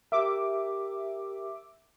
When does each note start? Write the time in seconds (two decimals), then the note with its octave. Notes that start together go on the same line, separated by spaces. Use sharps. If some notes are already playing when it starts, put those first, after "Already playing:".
0.12 G4 A#4 E5 D6